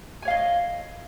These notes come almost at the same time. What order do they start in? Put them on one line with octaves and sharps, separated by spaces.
G#5 C#5 F5 D#5